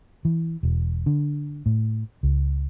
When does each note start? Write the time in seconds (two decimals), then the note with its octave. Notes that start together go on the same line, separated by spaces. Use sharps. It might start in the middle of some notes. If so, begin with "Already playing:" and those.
0.25 E3
0.63 E1
1.06 D3
1.66 A2
2.23 C#2